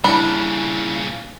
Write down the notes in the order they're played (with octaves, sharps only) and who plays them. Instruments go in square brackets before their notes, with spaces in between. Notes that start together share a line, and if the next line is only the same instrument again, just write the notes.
[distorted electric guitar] A#2 C#3 [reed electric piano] G3 E4 [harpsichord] D4 [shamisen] B5